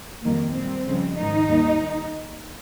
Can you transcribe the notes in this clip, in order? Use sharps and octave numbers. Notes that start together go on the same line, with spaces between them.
F2 D#3 G3 A#3
A#2 G3 C4
F2 C#3 G3
G#2 D#3 G3 D#4
D#2 D#3 G3